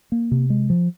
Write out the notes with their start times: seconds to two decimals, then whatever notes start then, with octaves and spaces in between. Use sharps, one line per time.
0.12 A#3
0.31 C3
0.50 G#3
0.70 F3